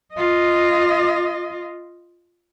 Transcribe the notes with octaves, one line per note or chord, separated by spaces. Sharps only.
F4 D#5